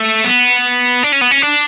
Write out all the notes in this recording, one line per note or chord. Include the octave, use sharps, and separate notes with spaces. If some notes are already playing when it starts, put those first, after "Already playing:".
Already playing: A3
B3
D4
C#4
B3
C#4
D4